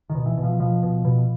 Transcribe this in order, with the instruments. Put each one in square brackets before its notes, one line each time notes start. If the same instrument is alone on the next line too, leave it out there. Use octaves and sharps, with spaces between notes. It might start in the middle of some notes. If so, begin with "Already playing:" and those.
[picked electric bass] D#3
B2
E3
B2
F3
B2 F3
B2
B2